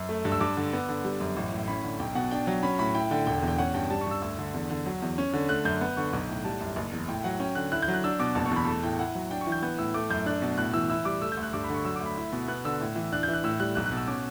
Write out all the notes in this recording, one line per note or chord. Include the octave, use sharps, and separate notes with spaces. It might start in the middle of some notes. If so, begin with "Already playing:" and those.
Already playing: F#2 E6
A3
G2
E6
G2 D6
D3
B3
D3
G3
F#2
A1
A2
C#4 B5
D3
B1 G5
B2 F#5
D4 G5
F#3
C#4 B5
A2 B5
E4 G5
D3 G5
E1 G5
E2
G5
C#4 F#5
G2 G5
G3 A5
C#6
G2 E6
D2 E6
D3
E2
D3
F#3
E2
C#4
D3
A3 F#6
F#2 G6
B3
D3 C#6
B1
A2
G3 A5
F#2
F#1
E2
A2 G5
F#3 F#5
C#4 G5
D3 F#6
E4 F#6
G6
F#3
F#6
D4 E6
B2 D6
F#1 A5
C#6
E2 B5
A3 A5
A2 G5
E4 F#5
F#3
D4 G5
C#6
E3
G6
B3 G6
A2 E6
A3 D6
F#2 G6
D4 F#6
B2
A2 F#6
E3 E6
E4 E6
G3 D6
A3 E6
G6
D2
F#6
G2 D6
B5
D3
C#6
F#3 E6
D6
D2
B5
E4
B2
B3 F#6
D3 E6
A2
E3
D4 F#6
G6
E3
F#6
A2 E6
G3 F#6
B1 F#6
F#6
B2
E6
C#4 D6